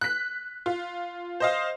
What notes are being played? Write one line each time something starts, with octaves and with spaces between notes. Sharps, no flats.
F#6 B6
F4
C5 D#5 F5